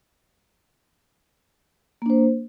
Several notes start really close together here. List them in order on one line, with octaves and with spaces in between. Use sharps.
A#3 D4 C5